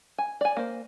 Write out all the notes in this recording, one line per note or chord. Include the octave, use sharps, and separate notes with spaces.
G#5
D5 G#5
A#3 C5